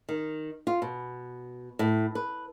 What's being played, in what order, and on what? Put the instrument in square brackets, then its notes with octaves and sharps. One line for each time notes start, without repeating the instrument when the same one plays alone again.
[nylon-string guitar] D#3
F4
B2
A2
B4